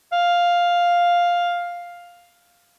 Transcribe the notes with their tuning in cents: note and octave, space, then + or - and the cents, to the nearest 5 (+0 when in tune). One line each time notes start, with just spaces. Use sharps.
F5 +5